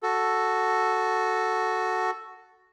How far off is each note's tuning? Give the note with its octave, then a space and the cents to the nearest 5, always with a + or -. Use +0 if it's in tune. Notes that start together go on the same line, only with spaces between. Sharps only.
F#4 +0 A4 +0